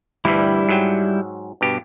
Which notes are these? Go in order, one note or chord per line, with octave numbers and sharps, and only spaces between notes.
D2 G2 E3 G3 E4
G#2 F#3 G5
G2 B2 G4